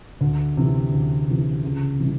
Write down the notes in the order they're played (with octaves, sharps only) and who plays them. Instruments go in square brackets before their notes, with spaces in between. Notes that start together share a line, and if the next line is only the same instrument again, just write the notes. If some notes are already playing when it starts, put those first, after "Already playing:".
[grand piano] D2
C3 E3
D2
C3 E3
C#2
C3 E3 G3